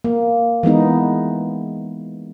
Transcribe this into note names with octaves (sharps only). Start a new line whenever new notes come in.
A#3
E3 G#3 B3 D#4